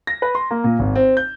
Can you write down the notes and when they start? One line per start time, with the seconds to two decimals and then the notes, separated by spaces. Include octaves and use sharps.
0.07 A#6
0.22 B4
0.35 C6
0.51 A#3
0.64 A#2
0.79 G#1
0.95 C4
1.17 G6